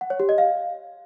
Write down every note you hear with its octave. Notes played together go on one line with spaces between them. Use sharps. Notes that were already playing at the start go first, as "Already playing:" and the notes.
F#5
C#5
G4
D#5
F5